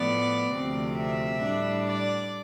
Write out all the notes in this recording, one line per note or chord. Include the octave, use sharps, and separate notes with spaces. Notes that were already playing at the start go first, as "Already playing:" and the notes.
Already playing: A2 F3 B3 D5
D2 C3 F3 C4
E5
A2 G3 D4
D5